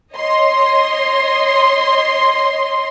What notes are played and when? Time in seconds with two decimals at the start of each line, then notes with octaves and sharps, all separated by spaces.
0.14 C#5 D#5 C6